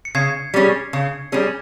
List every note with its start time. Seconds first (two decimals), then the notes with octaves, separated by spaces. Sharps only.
0.05 C#7
0.15 C#3 G#6 C7
0.54 G3 C#4 G#4
0.93 C#3
1.32 G3 C#4 G#4